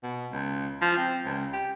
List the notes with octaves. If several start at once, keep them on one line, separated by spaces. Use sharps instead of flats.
B2
C#2
F3
C4
C#2
G4